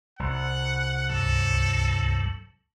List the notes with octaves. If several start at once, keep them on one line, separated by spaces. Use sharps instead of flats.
C2 F#5
C#2 G2 F#3 A4